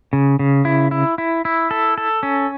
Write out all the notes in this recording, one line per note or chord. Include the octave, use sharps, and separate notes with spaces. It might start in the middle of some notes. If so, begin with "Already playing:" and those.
C#3
C#3
E4
E4
E4
E4
A4
A4
C#4